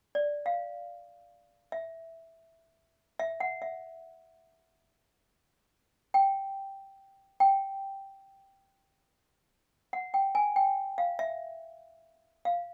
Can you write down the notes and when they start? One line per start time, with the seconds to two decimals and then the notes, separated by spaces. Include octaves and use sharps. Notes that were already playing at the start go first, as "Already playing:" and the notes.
0.15 D5
0.46 F5
1.72 E5
3.19 E5
3.40 F#5
3.62 E5
6.14 G5
7.40 G5
9.93 F#5
10.14 G5
10.35 G#5
10.56 G5
10.98 F5
11.19 E5
12.45 F5